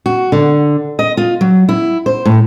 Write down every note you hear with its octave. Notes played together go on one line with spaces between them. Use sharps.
F#4
D3
D#5
F4
F#3
E4
C5
A2